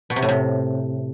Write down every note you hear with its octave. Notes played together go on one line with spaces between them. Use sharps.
B2
C3
A2
C3